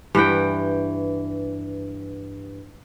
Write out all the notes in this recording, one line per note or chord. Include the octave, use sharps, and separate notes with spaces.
G2 E3 F#5 G5